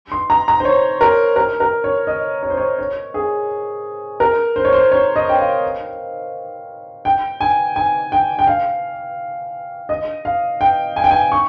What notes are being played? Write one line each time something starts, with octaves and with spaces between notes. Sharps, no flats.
C6
A#5
A#5
C5
C#5
A#4
A#4
A#4
C#5
D#5
C#5
C5
C#5
C#5
G#4
A#4
C5
C#5
C5
C#5
D#5
G5
F5
G5
G#5
G#5
G5
G5
F5
D#5
F5
G5
G#5
G5
G#5
C#6